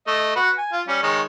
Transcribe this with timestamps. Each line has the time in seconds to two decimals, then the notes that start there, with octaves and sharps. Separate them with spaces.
0.07 A3 D#5
0.36 F#4 B4
0.58 G#5
0.72 F4
0.88 G3 C#4
1.03 D#3 G#3 C#5